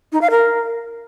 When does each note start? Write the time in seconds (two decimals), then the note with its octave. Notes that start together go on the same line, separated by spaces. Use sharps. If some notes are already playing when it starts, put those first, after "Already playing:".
0.12 D#4
0.21 F5
0.31 A#4